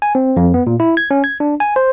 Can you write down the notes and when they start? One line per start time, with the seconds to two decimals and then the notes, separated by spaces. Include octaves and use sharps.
0.02 G#5
0.15 C4
0.37 F2
0.54 B3
0.67 A#2
0.80 E4
0.97 G#6
1.11 C#4
1.24 G#6
1.40 D4
1.60 G#5
1.76 C5